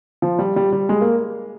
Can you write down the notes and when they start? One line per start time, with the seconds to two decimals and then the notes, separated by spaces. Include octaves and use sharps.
0.22 F3
0.39 G3
0.56 G3
0.73 G3
0.89 G#3
1.01 A#3